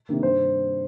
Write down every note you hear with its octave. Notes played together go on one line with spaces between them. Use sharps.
C3 D#3 A#3
G2 C5